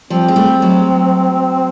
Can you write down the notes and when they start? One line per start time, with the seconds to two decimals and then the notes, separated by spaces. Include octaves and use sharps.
0.10 F3 G3 C4
0.28 G#3
0.36 G3 A3
0.62 F#3 G#3